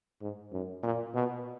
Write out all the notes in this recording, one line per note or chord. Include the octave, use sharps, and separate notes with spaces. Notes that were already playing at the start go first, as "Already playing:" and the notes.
G#2
F#2
A#2
B2